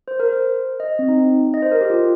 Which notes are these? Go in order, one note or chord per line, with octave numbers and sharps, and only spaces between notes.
C5
A#4
C5
D#5
C4
D#4
D#5
C5
A#4
G4
F4